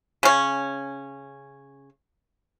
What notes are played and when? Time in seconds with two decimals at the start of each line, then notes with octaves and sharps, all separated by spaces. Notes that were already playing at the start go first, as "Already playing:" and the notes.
0.23 C#3 C#4